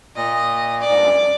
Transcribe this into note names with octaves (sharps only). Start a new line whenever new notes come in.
A#2 D#5
D5
G#2
G2
F#2